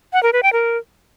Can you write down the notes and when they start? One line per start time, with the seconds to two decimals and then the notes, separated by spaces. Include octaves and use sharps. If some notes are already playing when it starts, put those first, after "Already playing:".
0.13 F#5
0.23 A#4
0.33 B4
0.43 G5
0.53 A#4